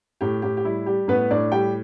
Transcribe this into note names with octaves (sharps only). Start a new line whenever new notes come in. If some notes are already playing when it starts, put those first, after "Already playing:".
A2 G4
A2 G4
G4
G3 E4
G3 G4
A2 B3 B4
A2 D4 D5
G3 G4 G5